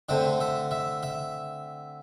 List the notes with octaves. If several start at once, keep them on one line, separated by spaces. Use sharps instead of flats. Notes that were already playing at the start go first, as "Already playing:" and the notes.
D3 A3 C4 E5
E5
E5
E5